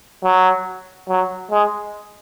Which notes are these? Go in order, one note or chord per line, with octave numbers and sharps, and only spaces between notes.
F#3
F#3
G#3